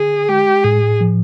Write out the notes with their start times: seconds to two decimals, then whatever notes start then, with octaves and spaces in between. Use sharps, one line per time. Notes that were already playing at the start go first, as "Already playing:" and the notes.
Already playing: D3 G#4
0.29 G#3 G4
0.64 A2 G#4
1.01 F3